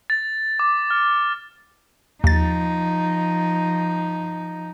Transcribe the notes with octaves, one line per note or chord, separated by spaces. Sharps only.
A6
D6
F6
D#2 F3 D#4 A6